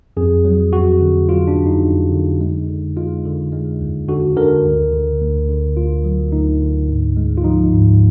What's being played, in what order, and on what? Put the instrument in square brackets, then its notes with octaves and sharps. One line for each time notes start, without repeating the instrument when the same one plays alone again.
[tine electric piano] F2 G#4
F#3
F2 F#4
D3
F#3 F4
D4
F2
D#4
F2
D3
G#3
D3
G#3 F4
D3
G#3
D#2
D3 F#4
D3 A#4
D2
D3
D2
D3
D2 F4
F#3
D2 D#4
D3
G#2
G#3
F4
F3 D#4
G#2